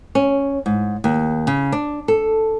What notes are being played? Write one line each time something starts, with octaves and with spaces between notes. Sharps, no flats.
C#4
G#2
D#2
C#3
D4
A4